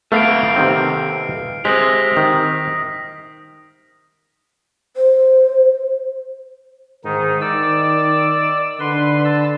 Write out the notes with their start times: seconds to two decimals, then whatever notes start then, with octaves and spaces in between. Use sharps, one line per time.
0.12 A3 B3 A4 B4 F5 F6 C7 D7
0.56 C3 D#3 C4
1.65 G#3 G4 C5 D#6 A#6 B6
2.17 D#3
4.97 C5
7.05 G#2 D#3 D#4
7.41 D#3 D5 E6
8.80 D3 B4 C6
9.24 A5 E6